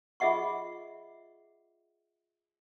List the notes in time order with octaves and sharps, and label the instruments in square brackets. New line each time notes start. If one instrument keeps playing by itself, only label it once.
[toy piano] F4 G#4 D#5 E5 F#5 C#6